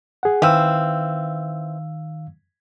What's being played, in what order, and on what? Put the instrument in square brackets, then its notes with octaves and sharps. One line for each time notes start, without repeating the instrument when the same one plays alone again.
[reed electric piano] G#4 F#5
[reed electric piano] D#3 F5 E6 [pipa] E3 C4